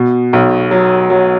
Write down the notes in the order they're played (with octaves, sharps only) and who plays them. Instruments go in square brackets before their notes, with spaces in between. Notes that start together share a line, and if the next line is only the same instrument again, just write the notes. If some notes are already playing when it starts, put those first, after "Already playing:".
Already playing: [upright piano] B2
B1
F#3
F#3